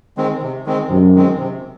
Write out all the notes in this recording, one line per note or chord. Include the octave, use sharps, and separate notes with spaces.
D#3 G#3 C4
C3
D#3 G#3 C4
F#2 C3
D#3 G#3 C4
C3